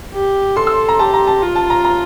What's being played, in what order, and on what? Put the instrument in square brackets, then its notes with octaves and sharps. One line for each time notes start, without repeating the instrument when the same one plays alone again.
[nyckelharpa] G4
[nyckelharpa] A4 [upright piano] C6
[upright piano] E6
A#5
[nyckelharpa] G4 [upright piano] A5
[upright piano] A#5
A5
[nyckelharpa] F4
[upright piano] A5
A#5
A#5